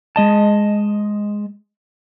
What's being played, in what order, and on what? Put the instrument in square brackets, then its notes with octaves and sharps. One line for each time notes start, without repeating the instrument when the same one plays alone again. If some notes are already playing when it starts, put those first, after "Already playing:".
[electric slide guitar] G#3 D#5 A5